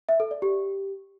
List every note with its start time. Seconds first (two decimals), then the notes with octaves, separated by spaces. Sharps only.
0.09 E5
0.20 A4
0.31 D5
0.42 G4